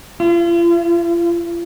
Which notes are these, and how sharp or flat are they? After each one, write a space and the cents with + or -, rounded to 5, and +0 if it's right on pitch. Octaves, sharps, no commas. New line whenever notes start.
F4 -40